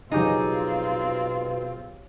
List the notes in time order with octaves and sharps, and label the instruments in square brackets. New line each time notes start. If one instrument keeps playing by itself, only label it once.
[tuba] B2 [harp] F#3 G4 G#4 [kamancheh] C4 F4 [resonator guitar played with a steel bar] D#4